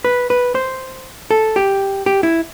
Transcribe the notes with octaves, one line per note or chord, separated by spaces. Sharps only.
B4
B4
C5
A4
G4
G4
E4